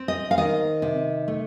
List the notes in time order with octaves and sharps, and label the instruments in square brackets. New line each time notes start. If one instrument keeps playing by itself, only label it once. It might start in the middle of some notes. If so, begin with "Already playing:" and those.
Already playing: [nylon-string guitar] C4
D#5
F5
D#3 D#5
C3
A3